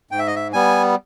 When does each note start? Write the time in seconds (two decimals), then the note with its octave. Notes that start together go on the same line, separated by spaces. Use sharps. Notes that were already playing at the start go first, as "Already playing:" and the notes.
0.11 G#2 G5
0.19 E5
0.27 D#5
0.36 E5
0.53 G3 B3 G#5